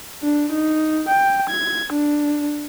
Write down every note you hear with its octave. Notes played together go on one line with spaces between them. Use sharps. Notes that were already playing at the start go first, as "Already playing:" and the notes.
D4
D#4
G5
G#6
D4